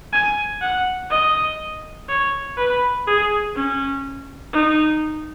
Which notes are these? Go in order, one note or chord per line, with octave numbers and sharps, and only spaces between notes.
G#5
F#5
D#5
C#5
B4
G#4
C#4
D#4